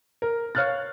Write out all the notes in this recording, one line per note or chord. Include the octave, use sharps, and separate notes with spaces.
A#4
C#5 F5 F6 F#6 A6